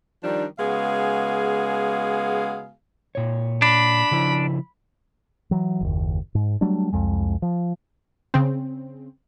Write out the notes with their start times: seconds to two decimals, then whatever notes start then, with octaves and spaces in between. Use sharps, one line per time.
0.24 D#3 F3 G3 D4
0.59 C#3 G#3 B3 F#4 G#4 F5
3.15 A#2 C#5
3.62 D4 B5
4.11 C#3 F3 E4
5.51 E3 F#3
5.81 F#1 D#2
6.35 G#2
6.61 F#3 G3 A3 D4
6.93 C2 F2 G#3
7.42 F3
8.34 C#3 C4